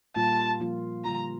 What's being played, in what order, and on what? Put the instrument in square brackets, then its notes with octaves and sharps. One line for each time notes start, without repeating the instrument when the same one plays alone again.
[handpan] A#2 G3 A#3 F4 [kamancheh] A5
[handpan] F3 A#3 F4
[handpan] D3 G3 A#3 F4 [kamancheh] A#5